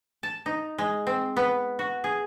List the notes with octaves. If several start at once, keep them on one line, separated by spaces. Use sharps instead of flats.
A5
D#4
G#3
C4
B3
F#4
G#4